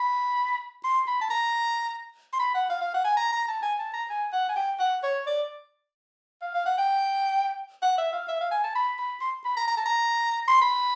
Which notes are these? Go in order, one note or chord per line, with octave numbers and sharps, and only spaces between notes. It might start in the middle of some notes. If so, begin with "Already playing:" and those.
Already playing: B5
C6
B5
A5
A#5
C6
B5
F#5
F5
F5
F#5
G#5
A#5
A#5
A5
G#5
A5
A#5
G#5
F#5
G#5
G5
F#5
C#5
D5
F5
F5
F#5
G5
F#5
E5
F5
E5
F5
G#5
A5
B5
B5
C6
B5
A#5
A#5
A5
A#5
C6
B5